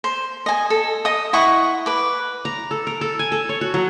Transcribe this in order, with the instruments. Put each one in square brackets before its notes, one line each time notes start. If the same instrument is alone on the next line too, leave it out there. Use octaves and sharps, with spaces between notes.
[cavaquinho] C5
D#5 G#5
A4
D#5 D#6
E4 F#5 C#6 D#6
B4 D6
[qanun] A#5
A4
A#4
A4
G#5
A4
C#5
F#4
F#3